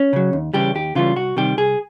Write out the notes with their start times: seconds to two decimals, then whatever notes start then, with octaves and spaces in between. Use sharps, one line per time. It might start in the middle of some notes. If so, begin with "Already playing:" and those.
Already playing: C#4
0.13 C#3 F#3
0.33 D#2
0.54 C#3 E3 G3 G4
0.75 D#2 G4
0.95 C#3 E3 G3 F4
1.16 C2 F#4
1.37 C3 D#3 G3 G4
1.57 C2 G#4